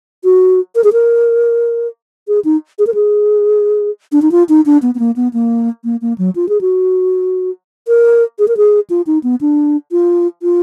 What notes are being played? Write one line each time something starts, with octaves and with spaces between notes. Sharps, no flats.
F#4
A#4
G#4
A#4
G#4
D#4
G#4
A#4
G#4
D4
D#4
F4
D#4
D4
B3
B3
A#3
B3
A#3
A#3
A#3
F#3
F4
G#4
F#4
A#4
G#4
A#4
G#4
F4
D#4
B3
D4
F4
F4